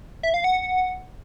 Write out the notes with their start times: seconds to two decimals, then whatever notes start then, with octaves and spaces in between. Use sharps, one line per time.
0.23 E5
0.34 F5
0.44 F#5